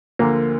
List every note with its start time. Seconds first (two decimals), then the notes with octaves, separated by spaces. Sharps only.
0.19 D2 D3 F3 A#3